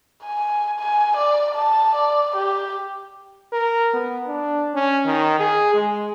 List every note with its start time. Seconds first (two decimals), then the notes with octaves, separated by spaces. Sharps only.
0.24 G#5
0.79 G#5
1.17 D5
1.54 A5
1.95 D5
2.36 G4
3.53 A#4
3.94 B3
4.28 D4
4.75 C#4
5.06 D#3
5.40 G#4
5.74 G#3